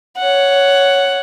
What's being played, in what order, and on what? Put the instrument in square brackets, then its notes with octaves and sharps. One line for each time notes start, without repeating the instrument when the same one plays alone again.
[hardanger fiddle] C#5 F#5